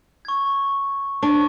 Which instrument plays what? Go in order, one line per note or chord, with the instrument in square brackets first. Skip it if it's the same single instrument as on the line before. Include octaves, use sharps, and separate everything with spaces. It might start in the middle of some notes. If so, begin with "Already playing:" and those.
[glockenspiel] C#6 G#6
[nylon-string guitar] D4 [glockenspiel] C#6 D6